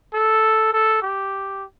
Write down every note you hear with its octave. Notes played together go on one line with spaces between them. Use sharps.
A4
A4
G4